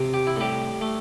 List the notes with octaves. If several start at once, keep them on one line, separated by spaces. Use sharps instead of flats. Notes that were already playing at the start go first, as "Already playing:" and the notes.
Already playing: C3
G4
E4
A2 G3 G4
A3